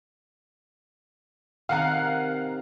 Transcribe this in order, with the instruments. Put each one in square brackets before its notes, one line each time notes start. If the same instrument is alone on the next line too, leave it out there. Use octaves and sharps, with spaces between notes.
[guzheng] C3 D#3 [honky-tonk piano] F5 F#5 A#5